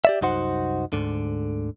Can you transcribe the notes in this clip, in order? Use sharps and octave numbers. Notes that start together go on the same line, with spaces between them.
G4 D5 E5
C2 F#2 D#4 F#4 C5 F#5
D2 G#2 D3